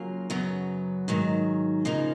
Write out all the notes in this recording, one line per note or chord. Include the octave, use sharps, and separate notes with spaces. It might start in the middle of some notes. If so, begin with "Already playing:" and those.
Already playing: C#3 F#3 A#3 F4
F#2 C#3 F#3 B3
G#2 D#3 F#3
C#3 F3 A#3 D#4